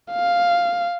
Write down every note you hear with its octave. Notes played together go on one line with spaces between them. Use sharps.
F5